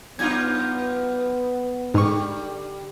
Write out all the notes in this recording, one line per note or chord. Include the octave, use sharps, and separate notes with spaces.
F#2 B3 D#4 F4 G#6
G#2 D3 G3 C#6